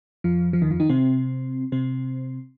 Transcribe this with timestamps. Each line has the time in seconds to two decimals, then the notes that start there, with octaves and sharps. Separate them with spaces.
0.24 F2 F3
0.53 F3
0.62 D#2 D#3
0.70 F2 F3
0.80 D#3 D#4
0.89 C3 C4
1.72 C3 C4